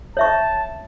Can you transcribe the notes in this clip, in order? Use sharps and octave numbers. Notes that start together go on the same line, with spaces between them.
C#5 E5 A5 C#6